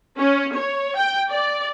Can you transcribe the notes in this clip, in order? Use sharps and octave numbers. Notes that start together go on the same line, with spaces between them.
C#4
C#5
G5
D5